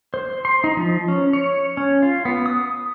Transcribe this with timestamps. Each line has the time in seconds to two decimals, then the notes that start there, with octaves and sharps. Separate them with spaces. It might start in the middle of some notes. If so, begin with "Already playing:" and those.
0.14 C5
0.45 C6
0.64 D#4
0.77 F3
1.08 C#4
1.33 C#5
1.77 C#4
2.02 F4
2.25 B3
2.46 D#6